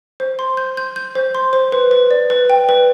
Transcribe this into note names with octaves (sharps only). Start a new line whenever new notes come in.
C5
C6
G6
G6
G6
C5
C6
C5
B4
B4
D5
B4
G5
B4